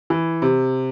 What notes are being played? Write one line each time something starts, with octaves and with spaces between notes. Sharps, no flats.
E3
C3